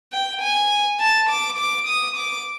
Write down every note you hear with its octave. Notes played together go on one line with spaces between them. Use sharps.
G5
G#5
A5
D6
D6
D#6
D6